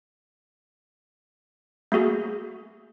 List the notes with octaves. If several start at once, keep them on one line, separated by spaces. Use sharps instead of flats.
A3 A#3 F#4 G#4